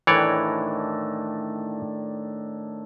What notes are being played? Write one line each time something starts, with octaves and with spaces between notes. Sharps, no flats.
A2 D#3 E3 D4 C#5 D5